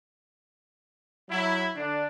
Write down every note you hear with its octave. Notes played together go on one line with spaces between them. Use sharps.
F#3 E4
D3 D4